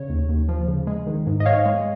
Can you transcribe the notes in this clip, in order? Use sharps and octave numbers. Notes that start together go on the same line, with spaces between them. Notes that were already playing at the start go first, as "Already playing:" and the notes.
Already playing: C#3 C#5
D#2
D#2
F3
C#3
G#3
D#3
G#2
D#5
G#2 C#5 F5
G#3